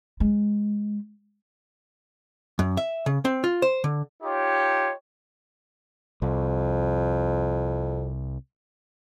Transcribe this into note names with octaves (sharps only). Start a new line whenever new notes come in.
G#3
F#2
E5
C#3
C4
F4
C5
D3
D#4 F4 G4 C#5
C2 F2